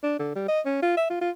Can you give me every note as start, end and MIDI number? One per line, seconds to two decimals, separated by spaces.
0.03 0.16 62
0.19 0.34 50
0.35 0.45 55
0.48 0.60 75
0.65 0.82 61
0.82 0.96 65
0.97 1.07 76
1.10 1.19 65
1.21 1.30 65